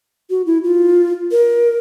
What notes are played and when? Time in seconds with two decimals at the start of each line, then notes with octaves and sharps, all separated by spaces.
0.30 F#4
0.46 E4
0.64 F4
1.32 A#4